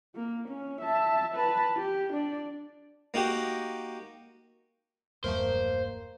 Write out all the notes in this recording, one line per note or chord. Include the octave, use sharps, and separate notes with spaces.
A#3
C#4
E5 A5
B4 A5
G4
D4 D5
A#3 D#4 F#4 G4
E1 E2 G2 F3 A3 A#3 A#4 C5